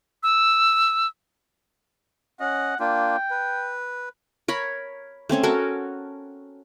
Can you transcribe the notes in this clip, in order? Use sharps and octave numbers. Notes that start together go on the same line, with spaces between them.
E6
C#4 D#5 F#5
A#3 D4 F4 G5
B4
A#4 C#5 B5
A3 C4 C#4 C#5
C#4 F#4 A4 A#4